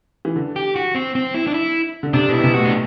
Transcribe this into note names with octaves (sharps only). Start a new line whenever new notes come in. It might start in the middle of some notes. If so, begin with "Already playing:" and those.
E3
D3
G4
F#4
C4
C4
E4
D4
E4
D3
C3 D4
B2
E4
B2
C3
A2 F#4
D4